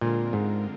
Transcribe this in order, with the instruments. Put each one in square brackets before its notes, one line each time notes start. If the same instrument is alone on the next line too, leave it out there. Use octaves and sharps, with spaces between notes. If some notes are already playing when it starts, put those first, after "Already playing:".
[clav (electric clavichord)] A#2 [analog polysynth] D3 G#3 C4 F4 A#4
[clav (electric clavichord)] G#2